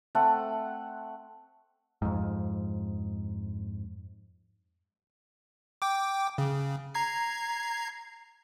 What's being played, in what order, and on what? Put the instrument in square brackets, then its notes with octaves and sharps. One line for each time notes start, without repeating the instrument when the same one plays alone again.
[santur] A3 C4 A4 F#5
[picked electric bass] F2 G#2
[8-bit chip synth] G5 D6
C#3
A#5 G#6 C7